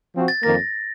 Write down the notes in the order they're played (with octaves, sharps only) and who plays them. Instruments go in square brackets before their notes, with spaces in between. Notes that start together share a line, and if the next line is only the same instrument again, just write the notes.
[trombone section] F3 C4 F#4
[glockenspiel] A6
[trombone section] F2 D#3 A#3 [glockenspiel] A#6